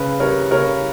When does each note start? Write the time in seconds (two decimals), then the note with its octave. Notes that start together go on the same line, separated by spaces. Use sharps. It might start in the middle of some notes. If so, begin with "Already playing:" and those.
Already playing: C#3 B4
0.20 G3 A#4 C#5
0.51 C#3 A#4 C#5